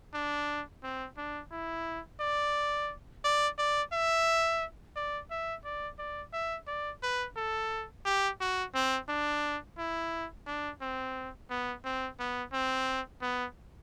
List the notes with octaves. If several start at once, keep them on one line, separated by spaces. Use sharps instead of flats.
D4
C4
D4
E4
D5
D5
D5
E5
D5
E5
D5
D5
E5
D5
B4
A4
G4
F#4
C4
D4
E4
D4
C4
B3
C4
B3
C4
B3